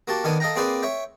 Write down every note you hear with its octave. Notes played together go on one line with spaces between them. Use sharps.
A#3 F#4 G4 A5
D#3 B3 D4 A4 G#5
A4 D#5 F5 G5 A#5
A#3 C4 G#4 B4 D5 G5
C#5 E5 G5